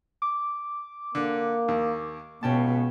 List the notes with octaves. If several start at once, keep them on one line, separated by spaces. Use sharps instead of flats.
D6
D3 A#3
D#2
C#2 B2 C#4 G5 A5